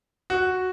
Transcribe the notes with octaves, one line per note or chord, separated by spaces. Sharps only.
F#4